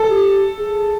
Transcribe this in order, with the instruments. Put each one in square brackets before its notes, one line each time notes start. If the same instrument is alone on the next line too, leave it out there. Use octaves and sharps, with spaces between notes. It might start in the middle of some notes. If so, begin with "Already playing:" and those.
Already playing: [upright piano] A4
[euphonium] G4
G#4